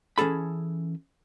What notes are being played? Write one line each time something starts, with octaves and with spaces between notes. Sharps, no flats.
E3 C#4 G#4 A4 B5